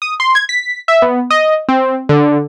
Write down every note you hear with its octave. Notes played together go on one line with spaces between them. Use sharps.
D#6
C6
G#6
B6
E5
B3
D#5
C4
D3